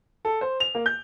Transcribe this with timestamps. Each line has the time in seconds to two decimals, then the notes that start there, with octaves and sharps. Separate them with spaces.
0.25 A4
0.41 C5
0.60 F7
0.75 A#3
0.86 G6